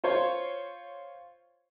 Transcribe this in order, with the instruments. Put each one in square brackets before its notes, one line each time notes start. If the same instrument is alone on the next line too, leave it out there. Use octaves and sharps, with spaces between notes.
[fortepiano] F4 C5 C#5